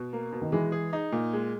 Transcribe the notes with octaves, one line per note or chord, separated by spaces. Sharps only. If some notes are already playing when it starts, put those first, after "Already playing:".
Already playing: B2
A#3
B2
D#3
E3 G#3
G#4
D#4
A#2
G#3